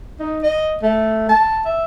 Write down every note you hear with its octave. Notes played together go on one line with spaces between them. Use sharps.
D#4
D#5
A3
A5
E5